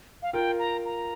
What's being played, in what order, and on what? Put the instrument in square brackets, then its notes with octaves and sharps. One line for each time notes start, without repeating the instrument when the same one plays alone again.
[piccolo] F5
[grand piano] F4 A#4 [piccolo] G5
[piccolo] A#5
A#5